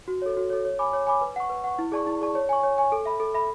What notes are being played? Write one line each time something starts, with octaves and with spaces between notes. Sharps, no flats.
F#4
A4 C#5
F#4
A4 C#5
C#5
G#5 B5 D6
C#5
G#5 B5 D6
B4
F#5 C#6
B4
F#5 C#6
E4
G#4 D5 A5 C#6
E4
G#4 D5 A5 C#6
C#5
G#5 C#6
C#5
G#5 C#6
A4
E5 B5
A4
E5 B5